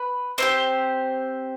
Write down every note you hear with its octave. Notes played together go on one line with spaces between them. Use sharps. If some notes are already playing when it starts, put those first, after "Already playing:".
Already playing: B4
C4 D#4 G4 C5